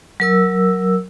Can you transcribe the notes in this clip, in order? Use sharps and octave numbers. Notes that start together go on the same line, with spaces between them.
F#3 A#4 E6